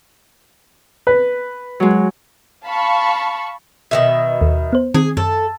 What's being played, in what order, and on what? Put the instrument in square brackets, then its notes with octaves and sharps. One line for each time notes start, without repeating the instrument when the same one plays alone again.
[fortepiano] B4
[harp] F#3 G#3
[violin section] F5 A5 B5 C#6
[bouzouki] B2 D#3 E5
[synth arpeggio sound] D#2
B3 C5
[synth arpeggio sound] D#3 C4 G#6 [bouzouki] G#4
[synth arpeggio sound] F#2 [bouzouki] A4